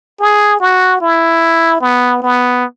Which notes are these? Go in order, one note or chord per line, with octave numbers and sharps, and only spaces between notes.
G#4
F#4
E4
B3
B3